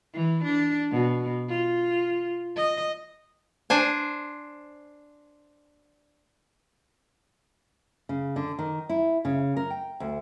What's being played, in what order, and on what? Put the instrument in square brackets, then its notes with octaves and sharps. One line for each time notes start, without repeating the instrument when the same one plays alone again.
[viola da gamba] E3
D4
B2
F4
D#5
[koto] D4 C5 G#5
[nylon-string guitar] C#3
D3
D#3
E4
C#3
A#4
G5
D2